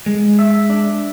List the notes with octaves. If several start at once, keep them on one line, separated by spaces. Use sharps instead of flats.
G#3
E5
D4